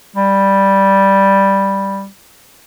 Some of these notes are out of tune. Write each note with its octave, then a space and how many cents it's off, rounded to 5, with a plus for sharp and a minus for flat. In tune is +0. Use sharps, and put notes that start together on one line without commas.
G3 +0